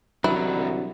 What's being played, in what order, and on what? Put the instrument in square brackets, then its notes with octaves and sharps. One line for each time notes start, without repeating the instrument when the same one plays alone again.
[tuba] C2 [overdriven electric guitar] D#3 D4 [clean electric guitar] F#3 [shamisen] E4